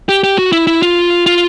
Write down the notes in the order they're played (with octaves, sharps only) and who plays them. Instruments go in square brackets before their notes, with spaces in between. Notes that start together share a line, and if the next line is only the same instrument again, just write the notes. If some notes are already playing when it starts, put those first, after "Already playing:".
[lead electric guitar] G4
G4
F#4
E4
E4
F4
F4